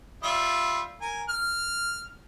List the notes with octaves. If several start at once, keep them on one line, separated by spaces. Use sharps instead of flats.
G3 F4 E5
A#4 G#5
F6